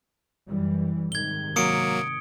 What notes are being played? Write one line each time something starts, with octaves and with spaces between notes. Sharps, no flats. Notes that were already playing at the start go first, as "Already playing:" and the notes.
F#2 E3 G3
G#2 C3 D#3 G#6 G7
F#3 A#3 D#6 C#7 D7